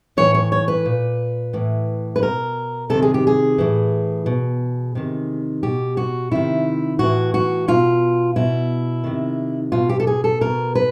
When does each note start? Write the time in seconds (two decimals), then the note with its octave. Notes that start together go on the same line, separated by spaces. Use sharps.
0.17 A2 E3 C#5
0.34 C#5
0.52 C#5
0.68 B4
0.85 A#2
1.53 A2 E3
2.16 B4
2.22 B2 A#4
2.90 C3 D#3 A4
3.02 G#4
3.14 G4
3.27 G#4
3.58 A2 E3
4.26 B2
4.95 C3 D#3
5.63 B2 G4
5.97 F#4
6.31 C3 D#3 E4
6.99 A2 E3 F#4
7.34 F#4
7.68 B2 F4
8.36 B2 E4
9.04 C3 D#3
9.72 B2 F4
9.89 G4
10.00 A4
10.07 G#4
10.24 A4
10.41 B2 A#4
10.75 B4